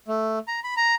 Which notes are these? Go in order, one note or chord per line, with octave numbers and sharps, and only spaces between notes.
A3
A#5
B5
A#5